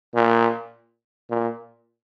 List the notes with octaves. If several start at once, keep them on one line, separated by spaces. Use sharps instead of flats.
A#2
A#2